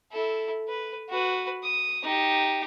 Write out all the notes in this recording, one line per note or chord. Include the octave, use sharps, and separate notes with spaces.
E4 A4
B4
F#4 B4
D#6
D#4 G4